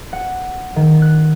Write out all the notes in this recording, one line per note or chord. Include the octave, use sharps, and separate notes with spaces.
F#5
D#3
F#6